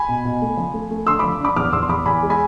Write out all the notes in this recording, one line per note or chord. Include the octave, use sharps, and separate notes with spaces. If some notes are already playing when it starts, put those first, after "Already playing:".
Already playing: G#5 B5
B2
B2
A3
F3
A3
A3
D3 C6 E6
F3 B5 D6
D4 B5 D6
E2 D6 F6
E2 C6 E6
C6
E2 B5 D6
E2 G#5 B5
G#3
G#5 B5